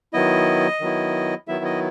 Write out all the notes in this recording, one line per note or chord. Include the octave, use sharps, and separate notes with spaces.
D#3 F#3 B3 E4 D#5
D#3 F#3 B3 E4
D#3 F#3 B3 E4 E5
D#5